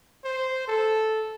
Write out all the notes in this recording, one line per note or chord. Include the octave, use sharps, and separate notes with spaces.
C5
A4